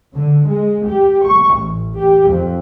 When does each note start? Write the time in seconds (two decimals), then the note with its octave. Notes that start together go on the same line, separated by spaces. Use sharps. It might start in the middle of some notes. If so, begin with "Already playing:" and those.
0.14 D3
0.47 G#3
0.86 G4
1.26 C#6
1.56 A1
1.99 G4
2.28 F2